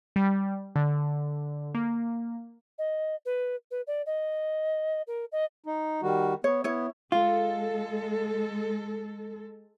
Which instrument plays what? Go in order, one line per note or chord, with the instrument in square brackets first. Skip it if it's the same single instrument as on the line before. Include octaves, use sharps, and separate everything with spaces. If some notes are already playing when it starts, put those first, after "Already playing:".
[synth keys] G3
D3
A#3
[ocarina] D#5
B4
B4
D5
D#5
A#4
D#5
[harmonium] D#4
D#3 G3 F#4
[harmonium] B3 [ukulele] C#5
[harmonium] B3 [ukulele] E4 C#5
[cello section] G#3 A4 [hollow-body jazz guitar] F4